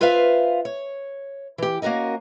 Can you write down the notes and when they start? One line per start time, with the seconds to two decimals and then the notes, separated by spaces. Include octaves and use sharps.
0.01 F4 B4 C5 E5 F5
0.65 C#5
1.58 E3 G4
1.82 A#3 C#4 F#4 A#4 D#5